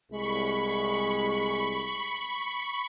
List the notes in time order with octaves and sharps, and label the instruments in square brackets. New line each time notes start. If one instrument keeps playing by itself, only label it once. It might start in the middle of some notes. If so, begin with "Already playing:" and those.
[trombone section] C2 G#3 [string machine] B5 C#6